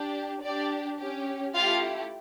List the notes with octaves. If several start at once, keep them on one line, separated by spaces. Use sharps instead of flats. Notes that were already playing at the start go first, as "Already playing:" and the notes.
Already playing: D4 G4
D4 G4 D5
C#4 G4
A3 E4 F4 G4 F5